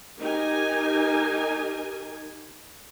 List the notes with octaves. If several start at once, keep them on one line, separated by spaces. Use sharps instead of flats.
D#4 G4 A#4 G#5